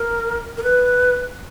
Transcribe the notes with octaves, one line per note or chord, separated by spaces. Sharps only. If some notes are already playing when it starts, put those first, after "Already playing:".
Already playing: A#4
A#4
B4